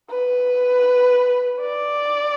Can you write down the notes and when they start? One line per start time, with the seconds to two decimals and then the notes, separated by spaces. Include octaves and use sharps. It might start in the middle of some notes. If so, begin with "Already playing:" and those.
0.10 B4
1.60 D5